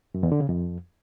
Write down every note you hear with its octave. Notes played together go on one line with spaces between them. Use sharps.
F#2
E2
D3
C#3
F2